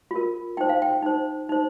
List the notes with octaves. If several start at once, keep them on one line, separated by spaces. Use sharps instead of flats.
F4 A#4
D#4 C5 G5
F5
G5
D#4 C5
D#4 C5